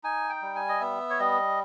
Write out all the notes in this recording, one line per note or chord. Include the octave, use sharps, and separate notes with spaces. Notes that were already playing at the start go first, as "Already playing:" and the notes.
D#4 G#5
G5
G3
G#5
D#5
B3 E5
C#5
G3 D#5